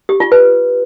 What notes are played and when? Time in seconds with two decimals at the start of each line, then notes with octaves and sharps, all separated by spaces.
0.09 G4
0.20 F4
0.32 B4